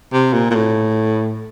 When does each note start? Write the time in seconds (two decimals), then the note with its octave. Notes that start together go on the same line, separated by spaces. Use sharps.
0.13 C3
0.33 A#2
0.51 A#2
0.55 A2